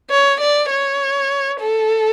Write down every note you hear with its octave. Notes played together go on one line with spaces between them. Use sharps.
C#5
D5
C#5
A4